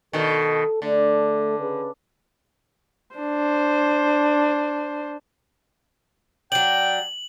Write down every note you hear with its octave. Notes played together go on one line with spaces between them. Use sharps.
B2 D#3 A4
D3 A3 A4
C#3 G#4 B4
D4 C5
F#3 D4 G5 F#7